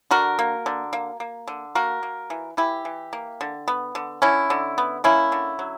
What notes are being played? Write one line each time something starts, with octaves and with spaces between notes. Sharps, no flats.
D3 F#4 A#4
A#3
D3
A#3
A#3
D3
A#3 F#4 A#4
A#3
E3
E3 E4 G4
E3
A#3
D3
B3
D3
D3 C#4 E4
D3
B3
A#3 C#4 E4
D3
F#3